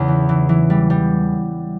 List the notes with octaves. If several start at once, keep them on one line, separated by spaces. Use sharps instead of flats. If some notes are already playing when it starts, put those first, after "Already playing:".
Already playing: E2 C#3
E3
E3
E3
G3
G3